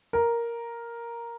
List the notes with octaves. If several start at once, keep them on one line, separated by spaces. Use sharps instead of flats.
A#4